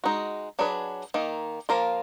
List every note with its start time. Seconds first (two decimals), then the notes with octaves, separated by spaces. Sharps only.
0.04 G#3 D#4 F#4
0.59 F#3 D4 G#4 B4
1.14 D#3 A#3 D#4
1.69 F3 A#3 F4 A#4